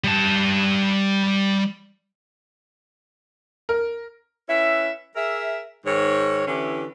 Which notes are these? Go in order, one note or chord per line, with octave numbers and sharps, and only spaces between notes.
G3 A5
A#4
C#4 E4 B4 E5
G#4 A#4 E5
G#2 D#3 C#5
D3 E3 C#4 E4 G4